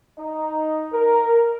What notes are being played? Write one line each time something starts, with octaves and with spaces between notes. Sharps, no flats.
D#4
A#4